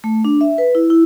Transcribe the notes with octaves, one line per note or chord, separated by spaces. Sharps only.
A3
D4
E5
B4
E4
E4